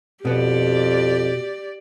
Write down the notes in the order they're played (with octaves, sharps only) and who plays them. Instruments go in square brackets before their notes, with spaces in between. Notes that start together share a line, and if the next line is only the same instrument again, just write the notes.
[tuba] F2 [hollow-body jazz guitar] B2 B3 [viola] G4 D5